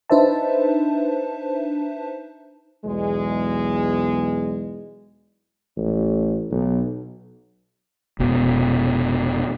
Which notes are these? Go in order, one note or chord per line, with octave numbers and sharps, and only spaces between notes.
D4 D#4 B4 C5 E5 A5
B1 E2 G#3
A1
B1
F1 B2